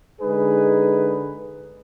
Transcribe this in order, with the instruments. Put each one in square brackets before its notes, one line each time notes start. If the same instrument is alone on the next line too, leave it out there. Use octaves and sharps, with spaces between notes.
[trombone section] D3 G#3 D#4 G#4 B4